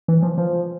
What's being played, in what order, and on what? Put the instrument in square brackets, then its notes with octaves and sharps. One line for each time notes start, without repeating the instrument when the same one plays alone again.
[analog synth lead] E3
F3
F3